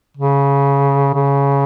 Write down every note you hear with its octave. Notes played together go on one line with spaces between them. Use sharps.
C#3
C#3